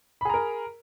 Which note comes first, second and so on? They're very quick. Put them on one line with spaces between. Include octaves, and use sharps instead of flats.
B5 G#4 A#5 A#4